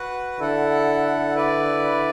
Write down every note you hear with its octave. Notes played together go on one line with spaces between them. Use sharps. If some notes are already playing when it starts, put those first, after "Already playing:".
Already playing: F#4 B4 F#5
D3 E4 A4 F#5
E4 B4 D5